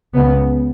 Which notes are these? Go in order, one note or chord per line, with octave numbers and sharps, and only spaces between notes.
C#2 C#3 B3